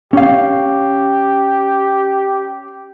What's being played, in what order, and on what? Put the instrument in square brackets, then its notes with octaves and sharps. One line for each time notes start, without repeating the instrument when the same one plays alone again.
[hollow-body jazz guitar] C#4 F5 [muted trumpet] G4